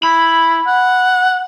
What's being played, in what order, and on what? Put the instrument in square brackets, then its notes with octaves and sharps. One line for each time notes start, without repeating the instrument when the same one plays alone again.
[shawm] E4 [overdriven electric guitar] B5
[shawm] F#5